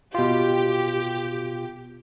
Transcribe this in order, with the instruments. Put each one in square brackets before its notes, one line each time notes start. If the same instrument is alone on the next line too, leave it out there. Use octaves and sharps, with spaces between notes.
[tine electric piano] B2 F4 [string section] G4